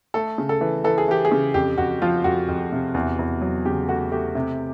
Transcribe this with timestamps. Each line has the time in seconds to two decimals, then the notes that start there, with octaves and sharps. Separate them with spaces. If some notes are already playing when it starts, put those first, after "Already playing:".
0.14 A3 A4
0.38 C#3
0.49 A4
0.61 E3
0.84 E3 A4
0.98 G#4
1.08 E3 G4
1.25 G#4
1.32 C#3
1.54 F2 G4
1.78 F2 F#4
2.02 F3 F4
2.24 F2 F#4
2.48 F2
2.72 C3
2.94 E2
3.19 E2
3.41 F#3
3.66 C#3 G4
3.88 A3 F#4
4.11 A3 G4
4.35 C3